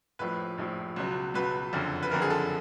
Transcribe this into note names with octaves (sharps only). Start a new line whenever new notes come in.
A#1 A2 F3 B4
A#1 A2 F3
C#2 B2 F#3
C#2 B2 F#3 B4
F#1 F2 D3
B4
F#1 F2 D3 A#4
G#4
A4